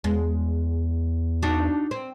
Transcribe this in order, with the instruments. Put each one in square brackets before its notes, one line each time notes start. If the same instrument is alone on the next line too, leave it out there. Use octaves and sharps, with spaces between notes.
[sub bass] E2 [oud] G#3
[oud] D4 D#4 F#4
C4